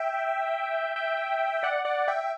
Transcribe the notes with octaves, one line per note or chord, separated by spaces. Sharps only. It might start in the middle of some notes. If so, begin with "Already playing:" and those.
Already playing: E5 G5
E5 G5
D5 F#5
D5 F#5
E5 G5